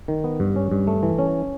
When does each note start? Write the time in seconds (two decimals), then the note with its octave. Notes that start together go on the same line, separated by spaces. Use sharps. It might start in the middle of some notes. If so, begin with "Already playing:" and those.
0.08 D#3
0.24 B3
0.40 G2
0.56 C#4
0.71 G2
0.87 A3
1.03 E3
1.19 C#4